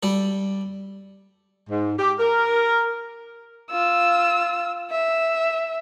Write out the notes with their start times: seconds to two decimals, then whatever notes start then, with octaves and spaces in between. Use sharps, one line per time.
0.03 G3 A4
1.69 G#2
1.98 G4
2.19 A#4
3.71 F4 E6
4.91 E5